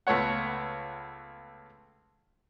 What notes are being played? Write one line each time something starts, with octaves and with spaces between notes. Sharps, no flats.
C#2 A3 B3 C#5 F#5